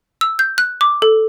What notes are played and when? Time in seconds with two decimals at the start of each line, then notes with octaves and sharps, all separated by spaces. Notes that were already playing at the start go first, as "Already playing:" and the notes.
0.21 E6
0.39 G6
0.58 F#6
0.81 D6
1.02 A4